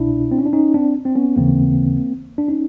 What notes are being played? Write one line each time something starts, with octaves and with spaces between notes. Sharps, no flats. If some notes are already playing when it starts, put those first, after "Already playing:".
Already playing: C2 B2 D4 E4
C4
C#4
D4
C#4 D#4
C4 D4
C4
B3 C#4
D#2 C#3 E3 A#3 C4
D4
C#4 D#4